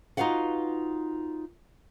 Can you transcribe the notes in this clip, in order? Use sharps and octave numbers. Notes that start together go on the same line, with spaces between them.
D#4 F4 F#4 B4 F5 F#5